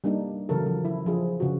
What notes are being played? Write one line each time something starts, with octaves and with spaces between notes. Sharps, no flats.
G3 A#3 D4 D#4
C#3 E3 F#3 E4 A4 A#4
F3
E4
F3 D4 G#4
C#3 F4 F#4